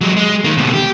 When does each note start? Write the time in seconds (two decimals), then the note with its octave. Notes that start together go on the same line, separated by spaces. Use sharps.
0.01 F#3 G#3
0.17 G#3
0.44 D#3 A#3
0.57 D2 B2
0.74 G4